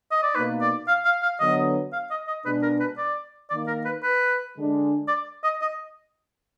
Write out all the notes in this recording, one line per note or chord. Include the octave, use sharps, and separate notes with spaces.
D#5
D5
B2 A#3 D#4 B4
D5
F5
F5
F5
D3 F#3 B3 D#5
F5
D#5
D#5
B2 G#3 D4 B4
A#4
B4
D5
D#3 A#3 D#4 D5
A#4
B4
B4
D3 G#3 D4
D5
D#5
D#5